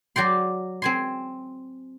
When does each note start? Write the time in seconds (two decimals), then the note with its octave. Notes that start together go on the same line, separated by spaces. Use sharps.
0.16 F#3 D5 G5 C6
0.82 C4 G#5 C6